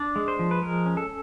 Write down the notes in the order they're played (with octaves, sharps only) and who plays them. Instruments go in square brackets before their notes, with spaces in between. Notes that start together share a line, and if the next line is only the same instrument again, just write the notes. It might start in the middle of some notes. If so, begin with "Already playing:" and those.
Already playing: [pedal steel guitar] D4 D5
G#3
C5
F3
B4
G#3 A#4
C#4
A4